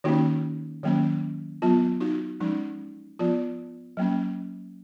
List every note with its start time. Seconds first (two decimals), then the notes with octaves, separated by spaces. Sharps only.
0.04 D#3 A#3 C#4 D#4 F#4
0.83 D#3 F#3 A#3 C#4
1.62 F#3 B3 F4
2.00 D#4 F#4
2.40 F3 G#3 C#4 D#4
3.19 F3 B3 F4
3.97 F#3 A#3 C#4